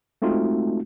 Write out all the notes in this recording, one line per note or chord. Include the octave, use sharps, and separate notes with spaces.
G#3 A3 C4 D#4 F4 F#4